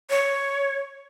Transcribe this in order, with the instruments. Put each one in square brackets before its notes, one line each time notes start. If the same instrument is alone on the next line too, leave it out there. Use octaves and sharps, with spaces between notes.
[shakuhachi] C#5